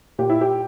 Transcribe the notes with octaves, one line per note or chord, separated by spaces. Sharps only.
A#2 G4
E4
G4